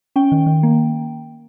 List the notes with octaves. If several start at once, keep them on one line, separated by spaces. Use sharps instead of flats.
C#4 G5
D#3
D#3
A#3